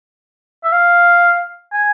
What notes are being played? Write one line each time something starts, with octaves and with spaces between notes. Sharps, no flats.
E5
F5
G#5